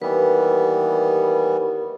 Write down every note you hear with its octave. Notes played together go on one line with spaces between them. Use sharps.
D#2 E3 G3 B3 B4